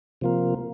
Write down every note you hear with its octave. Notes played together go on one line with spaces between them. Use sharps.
C3 F3 A#3 F4 A#4